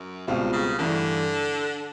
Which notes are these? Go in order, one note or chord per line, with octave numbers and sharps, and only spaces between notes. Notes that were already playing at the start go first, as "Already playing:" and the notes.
Already playing: F#2
C#2 G2 B2 G3 C4 F4
C#3
G2 D3 E3 A3